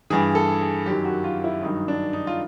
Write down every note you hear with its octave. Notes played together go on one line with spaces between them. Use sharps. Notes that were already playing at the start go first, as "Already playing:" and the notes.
G2 E3 G#4
A4
G#4
F#2 D#3 F#3 G4
F#4
F4
E4
G2 D#3 F#3 D#4
D4
D#4
F4